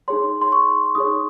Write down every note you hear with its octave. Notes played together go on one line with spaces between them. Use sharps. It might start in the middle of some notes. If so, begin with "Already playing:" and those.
D#4 G#4 C#5 C6
C6
C#6
D#4 G#4 C#5 D#6